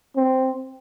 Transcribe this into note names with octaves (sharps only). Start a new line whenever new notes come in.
C4